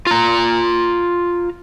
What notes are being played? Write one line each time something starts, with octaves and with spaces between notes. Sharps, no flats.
F4 A#5